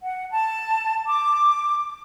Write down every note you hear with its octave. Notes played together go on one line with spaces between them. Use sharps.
F#5
A5
D6